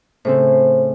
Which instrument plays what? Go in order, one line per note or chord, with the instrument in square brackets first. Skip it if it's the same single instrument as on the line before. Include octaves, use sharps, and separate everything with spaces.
[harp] A2 C#3 C4 [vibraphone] C5